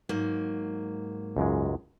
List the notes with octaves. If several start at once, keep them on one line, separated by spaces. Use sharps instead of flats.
G#2 F#3 A#3
C#2 F#2 G#3